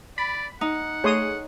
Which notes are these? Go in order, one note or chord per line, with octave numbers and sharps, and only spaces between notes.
D5 B5
D#4 F#5
A3 G#4 C#5 C6 D#6